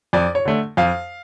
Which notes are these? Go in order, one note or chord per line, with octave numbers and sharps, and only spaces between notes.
F2 D5
C#5
D3 A3
F2 F5